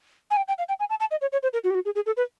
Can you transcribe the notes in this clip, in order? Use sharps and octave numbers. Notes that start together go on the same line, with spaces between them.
G#5
G5
G5
F5
G5
G#5
A5
A5
D#5
C#5
C#5
C5
A#4
F#4
G4
F#4
G#4
G#4
A4
B4